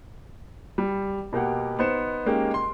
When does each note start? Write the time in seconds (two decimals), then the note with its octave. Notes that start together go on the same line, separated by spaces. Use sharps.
0.78 G3
1.33 B2 A#3 G4 F#5
1.79 B3 D#4 C5 C#7 E7
2.26 G#3 A#3 C#4 D#4 G4
2.54 C6